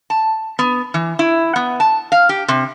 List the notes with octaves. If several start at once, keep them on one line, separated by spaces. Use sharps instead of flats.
A5
B3
E3
E4
B3
A5
F5
G4
C3